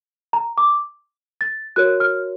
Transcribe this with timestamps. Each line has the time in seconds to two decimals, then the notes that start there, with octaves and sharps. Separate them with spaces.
0.33 A#5
0.58 D6
1.41 A6
1.76 F#4 A#4 C#5 F#6
2.00 F6